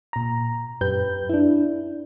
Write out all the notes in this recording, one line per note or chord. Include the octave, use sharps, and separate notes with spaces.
A#2 A#5
F#2 G4 B4 G6
D4 E4